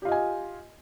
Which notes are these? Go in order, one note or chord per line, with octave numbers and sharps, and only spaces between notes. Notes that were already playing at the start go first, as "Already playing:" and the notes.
F4 G4 D#5 G#5